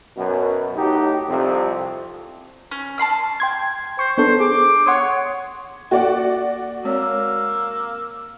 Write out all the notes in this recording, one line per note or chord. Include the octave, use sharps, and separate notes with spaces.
F#2 B2
A2 D#4 F#4 G4
C2 F2 C3
C#4
A5 B5 C6 F6
G5 C6 G#6
C5 C#6
B3 D4 A4 C5
G#4 D6
C#5 F#5 C6 D#6
A#3 F#4 A4 D5 F#5
G#3 A#3 C4 C#5 E6